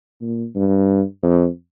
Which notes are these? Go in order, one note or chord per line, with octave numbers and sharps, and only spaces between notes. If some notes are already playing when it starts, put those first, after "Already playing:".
A#2
G2
F2